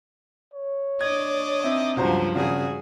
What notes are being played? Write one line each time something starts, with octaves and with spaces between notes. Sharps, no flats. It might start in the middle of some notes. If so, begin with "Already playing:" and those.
C#5
D4 D5 D#5 G#6
C4 D#4 E5
C#2 G2 F3 F#3 F#4 C5 A#5
G#1 C#3 F#4 G#4 F#5